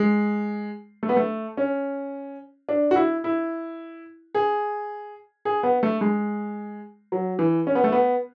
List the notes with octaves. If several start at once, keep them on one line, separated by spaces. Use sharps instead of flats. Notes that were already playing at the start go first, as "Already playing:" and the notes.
Already playing: G#3
A3
B3
A3
C#4
D4
F#4
E4
E4
G#4
G#4
B3
A3
G#3
F#3
E3
C#4
B3
A3
B3